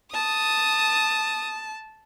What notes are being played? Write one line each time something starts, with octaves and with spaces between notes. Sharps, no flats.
A5 D#6